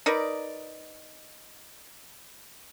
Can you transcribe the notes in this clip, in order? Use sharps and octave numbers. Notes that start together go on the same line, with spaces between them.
D#4 A#4 B4 D5